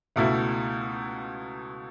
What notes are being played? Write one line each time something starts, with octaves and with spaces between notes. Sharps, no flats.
C#2 B2 A3 E4